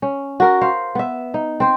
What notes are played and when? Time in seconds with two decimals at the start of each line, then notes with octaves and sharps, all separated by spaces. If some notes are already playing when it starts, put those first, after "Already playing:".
0.02 C#4
0.40 F#4 A#4
0.61 C5 F5
0.95 B3 E5
1.34 D#4
1.60 C4 C5